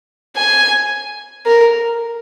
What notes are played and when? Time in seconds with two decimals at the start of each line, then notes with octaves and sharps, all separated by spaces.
0.36 G#5
1.46 A#4